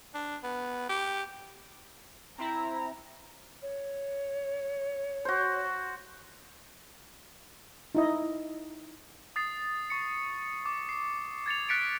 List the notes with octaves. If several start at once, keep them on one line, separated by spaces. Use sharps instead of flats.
D4
B3
G4
C4 E4 A#5
C#5
F#4 C5
D#4 E4 D#5
D#6 A6 C7
C#6 C#7
D6
C7
G#6 A6 C#7 F7
F6 F#6 A6 B6 C#7 D7